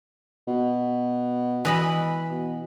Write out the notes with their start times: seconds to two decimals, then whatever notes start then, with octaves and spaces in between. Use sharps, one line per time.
0.47 B2
1.65 E3 D#5 B5
2.30 B2